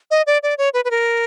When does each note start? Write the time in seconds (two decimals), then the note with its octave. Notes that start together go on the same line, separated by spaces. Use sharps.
0.11 D#5
0.27 D5
0.43 D5
0.58 C#5
0.74 B4
0.85 B4
0.91 A#4